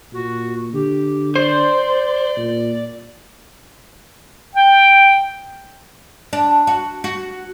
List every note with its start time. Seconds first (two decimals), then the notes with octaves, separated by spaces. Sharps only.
0.13 A#2 F#4
0.73 D3 G4
1.36 C5 D5
2.37 A#2
4.55 G5
6.33 D4
6.67 F#4
7.04 F#4